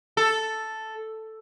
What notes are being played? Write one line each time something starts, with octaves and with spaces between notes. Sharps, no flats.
A4